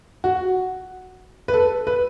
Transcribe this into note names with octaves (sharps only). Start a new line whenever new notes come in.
F#4
B4
A4
B4